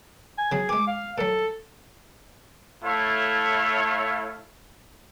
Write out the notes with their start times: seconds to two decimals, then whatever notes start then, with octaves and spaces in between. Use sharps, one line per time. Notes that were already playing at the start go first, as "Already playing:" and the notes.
0.38 G#5
0.52 C#3 F#3 G#4
0.69 G#3 G#4 D6
0.87 F5
1.18 A#2 F#3 A4
2.84 A3 E4 A4 C#5 F5